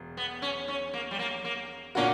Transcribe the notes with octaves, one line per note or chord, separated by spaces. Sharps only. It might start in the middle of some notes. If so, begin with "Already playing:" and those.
Already playing: E1
B3
C#4
C#4
A#3
G3
A#3
A#3
A#2 A#3 C#4 D4 F#4